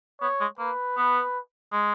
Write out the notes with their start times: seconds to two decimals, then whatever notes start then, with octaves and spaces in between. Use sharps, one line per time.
0.21 B3 C#5
0.41 G#3
0.59 A#3 B4
0.97 B3
1.72 G#3